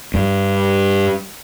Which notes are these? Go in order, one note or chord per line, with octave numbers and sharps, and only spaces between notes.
G2